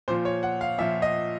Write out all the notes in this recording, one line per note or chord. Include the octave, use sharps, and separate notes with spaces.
A#2 F3 C5
C#5
F#5
F5
A#2 F3 E5
D#5